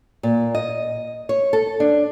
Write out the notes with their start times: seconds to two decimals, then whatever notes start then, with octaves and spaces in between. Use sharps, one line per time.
0.23 A#2
0.55 D#5
1.29 C#5
1.53 A4
1.80 D4